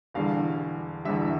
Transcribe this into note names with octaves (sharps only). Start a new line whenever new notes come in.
E1 E2 D3 G3 F5
E1 E2 D3 G3 E5